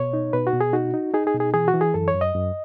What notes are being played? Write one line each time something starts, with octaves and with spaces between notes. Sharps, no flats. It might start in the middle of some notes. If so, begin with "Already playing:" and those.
Already playing: B2 C#5
D#4
B2 B4
F#4
B2
G#4
D#4 F#4
D#4
D#4 G#4
G#4
B2
G#4
E3 G#4
F#4
E3
G#4
F#2 A4
C#5
F#2
D#5
F#2